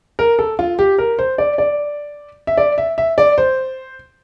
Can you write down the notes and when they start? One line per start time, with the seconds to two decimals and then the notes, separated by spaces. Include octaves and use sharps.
0.19 A#4
0.39 A4
0.59 F4
0.79 G4
0.98 A#4
1.19 C5
1.38 D5
1.58 D5
2.47 E5
2.57 D5
2.78 E5
2.98 E5
3.18 D5
3.38 C5